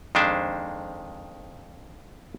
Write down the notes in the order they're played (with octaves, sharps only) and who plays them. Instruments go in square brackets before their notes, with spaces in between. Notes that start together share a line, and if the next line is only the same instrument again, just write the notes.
[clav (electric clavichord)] F2 D#3 G#3 D4 C5 E5